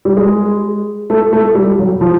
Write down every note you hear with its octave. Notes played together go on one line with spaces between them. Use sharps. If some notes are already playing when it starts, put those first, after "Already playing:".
G3
G#3
A3
A3
G3
F#3
F3